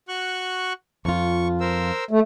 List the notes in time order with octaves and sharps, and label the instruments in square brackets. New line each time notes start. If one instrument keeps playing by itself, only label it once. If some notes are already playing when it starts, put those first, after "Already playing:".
[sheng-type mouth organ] F#4 C#6 F#6
[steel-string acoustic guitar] F2 F4 [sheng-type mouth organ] C#6
[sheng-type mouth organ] A#4 C5 E6
[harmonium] A3